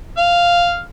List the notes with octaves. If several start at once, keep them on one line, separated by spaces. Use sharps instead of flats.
F5